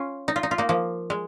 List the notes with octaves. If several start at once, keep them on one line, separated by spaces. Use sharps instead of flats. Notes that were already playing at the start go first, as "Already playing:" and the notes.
Already playing: C#4 F4
D#4
F4
D#4
F4
A#3 D#4
F3 A#3
G#3